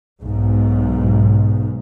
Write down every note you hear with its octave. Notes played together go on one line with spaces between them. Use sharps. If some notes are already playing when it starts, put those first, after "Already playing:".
B1 G#2